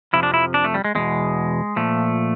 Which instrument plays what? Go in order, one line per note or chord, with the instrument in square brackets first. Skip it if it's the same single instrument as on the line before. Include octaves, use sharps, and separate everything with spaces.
[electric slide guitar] F2 C3 F3 E4
D4
E4
D4
A3
G3
G#3
E2 B2 G#3
A#2 F3 A3